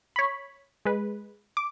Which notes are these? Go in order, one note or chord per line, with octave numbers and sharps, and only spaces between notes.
C#5 B5
G#3 B4
D6